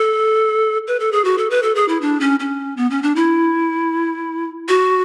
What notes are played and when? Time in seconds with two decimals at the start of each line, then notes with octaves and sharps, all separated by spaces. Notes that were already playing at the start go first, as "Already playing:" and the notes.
Already playing: A4
0.87 B4
1.00 A4
1.12 G#4
1.25 F#4
1.38 A4
1.50 B4
1.63 A4
1.75 G#4
1.88 E4
2.01 D4
2.21 C#4
2.40 C#4
2.77 B3
2.90 C#4
3.03 D4
3.16 E4
4.69 F#4